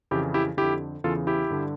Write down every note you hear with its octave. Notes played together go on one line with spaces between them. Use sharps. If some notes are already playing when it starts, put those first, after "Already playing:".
F2 C#3 E3 E4 G4
E4 G4
F2 D3 E4 G4
E2 C#3 E3 F4 A4
E4 G4
G2 D3